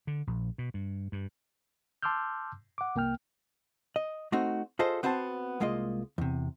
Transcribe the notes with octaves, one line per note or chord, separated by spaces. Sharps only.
D3
A#1
B2
G2
G2
A5 C6 D6 E6 F6 G6
F#5 D6
C2 A#3 G5 F6
D#5
A3 C4 D#4 F#4
F4 G#4 A4 C5 D#5
B3 C4 F#4 C5 F5 A5
C2 G#3 A#3 F4 D#5
E2 C3